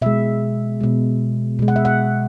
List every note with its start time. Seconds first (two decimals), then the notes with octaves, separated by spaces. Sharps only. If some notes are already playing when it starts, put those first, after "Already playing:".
0.02 B2 G#3 E5
0.81 B2 G#3
1.59 B2 G#3
1.68 F#5
1.76 E5
1.85 F#5